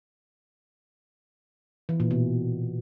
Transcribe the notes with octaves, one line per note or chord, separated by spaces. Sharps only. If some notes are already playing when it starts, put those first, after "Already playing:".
E3
A#2
B2